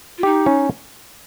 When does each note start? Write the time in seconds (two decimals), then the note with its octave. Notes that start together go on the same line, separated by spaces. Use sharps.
0.17 F4
0.23 D#4 G4
0.46 C#4